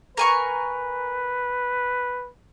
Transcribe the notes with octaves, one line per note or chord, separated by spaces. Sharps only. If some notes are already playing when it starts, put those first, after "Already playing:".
A#4 B4 G#5 C#6